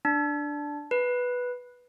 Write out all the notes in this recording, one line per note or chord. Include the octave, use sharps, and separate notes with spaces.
D4
B4